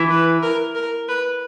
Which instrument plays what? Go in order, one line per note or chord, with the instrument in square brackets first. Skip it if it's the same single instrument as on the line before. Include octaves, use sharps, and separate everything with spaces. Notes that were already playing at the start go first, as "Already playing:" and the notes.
Already playing: [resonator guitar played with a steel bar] E3
[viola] B4
A#4
A#4
B4